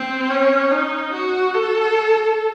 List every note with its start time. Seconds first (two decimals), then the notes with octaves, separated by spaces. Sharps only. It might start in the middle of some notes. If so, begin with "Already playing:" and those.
Already playing: C4
0.30 C#4
0.71 D#4
1.13 F#4
1.54 A4